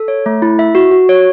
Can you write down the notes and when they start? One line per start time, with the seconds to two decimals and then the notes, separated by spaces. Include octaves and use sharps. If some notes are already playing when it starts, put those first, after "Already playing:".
Already playing: A4
0.08 C#5
0.26 A3
0.42 E4
0.59 E5
0.75 F#4
0.91 F#4
1.09 C#5